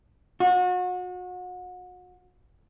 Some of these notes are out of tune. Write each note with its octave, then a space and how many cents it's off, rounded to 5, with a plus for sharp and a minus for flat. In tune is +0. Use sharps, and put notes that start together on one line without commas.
F#4 -35